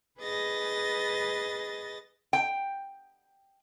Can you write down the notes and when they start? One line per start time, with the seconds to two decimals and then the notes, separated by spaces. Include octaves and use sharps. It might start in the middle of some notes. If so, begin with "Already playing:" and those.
0.20 G#4 B4 D#5 A6 A#6
2.33 G5